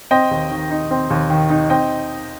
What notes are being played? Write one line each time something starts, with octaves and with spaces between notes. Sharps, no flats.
C4 D#5 G5
D#2
D#3
D#4
C4
D#2
D#3
D#4
C4 D#5 G5